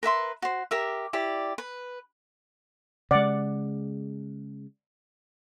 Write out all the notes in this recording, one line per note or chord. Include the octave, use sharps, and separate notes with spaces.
A#4 B4 E5 C6
F#4 C5
G4 A#4 E5
E4 G4 D5
B4
C#3 G#3 D5 F#5